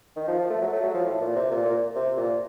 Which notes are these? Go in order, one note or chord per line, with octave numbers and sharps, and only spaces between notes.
D#3
F3
F3
A3
F#3
A3
F#3
F3
A2
A#2
C3
A#2
A#2
C3
A#2